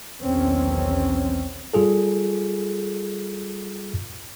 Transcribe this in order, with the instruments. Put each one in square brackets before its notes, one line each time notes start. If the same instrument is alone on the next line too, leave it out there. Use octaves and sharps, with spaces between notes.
[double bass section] B1 E2 D#3 C4 C#4
[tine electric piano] G3 F4 G#4 A4